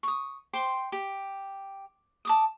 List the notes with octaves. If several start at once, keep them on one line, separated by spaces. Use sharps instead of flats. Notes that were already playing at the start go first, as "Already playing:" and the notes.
C#6 D#6
C5 G5 C6 D6
G4
A5 D6 D#6